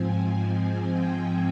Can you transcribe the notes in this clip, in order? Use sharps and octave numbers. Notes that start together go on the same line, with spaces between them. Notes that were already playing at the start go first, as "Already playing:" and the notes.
Already playing: G#2 F3 C4 G#5
G5